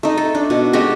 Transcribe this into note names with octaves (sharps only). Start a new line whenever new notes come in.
A3 D#4
A4
D4
B2
G#3 A3 F#4 G4